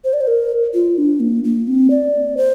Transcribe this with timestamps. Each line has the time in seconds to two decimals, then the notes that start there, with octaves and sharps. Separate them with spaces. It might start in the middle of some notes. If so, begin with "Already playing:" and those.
0.04 C5
0.13 D5
0.21 C5
0.27 A#4
0.74 F4
0.98 D4
1.20 A#3
1.44 A#3
1.68 C4
1.90 D5
2.37 C5